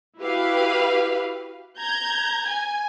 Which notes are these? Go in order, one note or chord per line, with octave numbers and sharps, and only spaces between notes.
E4 F#4 G4 B4 F5
A#5 G6 G#6
G#5